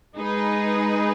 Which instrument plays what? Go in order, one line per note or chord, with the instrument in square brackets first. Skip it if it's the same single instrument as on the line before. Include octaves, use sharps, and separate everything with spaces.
[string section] G#3 D#4 G#4 B4